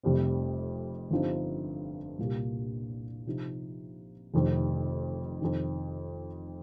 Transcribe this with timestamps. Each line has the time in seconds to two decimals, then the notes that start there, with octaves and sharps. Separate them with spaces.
0.03 F1 F2 C3 G3 C4
1.11 G1 G2 F3 C4 D#4
2.18 C2 A#2 A#3 G4
3.26 C3 F3 D#4
4.34 F1 F2 D#3
5.41 F2 C3 D#3